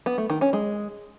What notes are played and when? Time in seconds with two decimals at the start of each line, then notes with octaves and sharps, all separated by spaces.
0.06 B3
0.18 A3
0.30 D#3
0.41 C#4
0.53 G#3